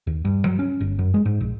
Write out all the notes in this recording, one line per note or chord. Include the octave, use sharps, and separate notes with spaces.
D#2
G2
F#3
C#4
G1
F#2
G#3
G#2
A#1